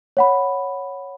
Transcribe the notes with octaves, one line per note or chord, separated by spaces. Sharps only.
C#5 F#5 B5